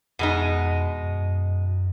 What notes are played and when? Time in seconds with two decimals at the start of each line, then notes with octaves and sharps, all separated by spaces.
0.19 F2 B2 G#3 D#4
1.03 F#2